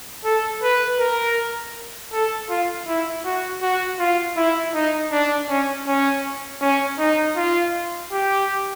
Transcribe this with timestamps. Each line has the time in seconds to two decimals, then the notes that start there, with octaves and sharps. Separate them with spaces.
0.24 A4
0.63 B4
0.99 A#4
2.13 A4
2.49 F4
2.87 E4
3.24 F#4
3.62 F#4
3.99 F4
4.37 E4
4.74 D#4
5.11 D4
5.49 C#4
5.86 C#4
6.61 C#4
6.99 D#4
7.36 F4
8.12 G4